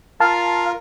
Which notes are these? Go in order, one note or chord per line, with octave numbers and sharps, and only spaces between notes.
F4 A#4 F5 A5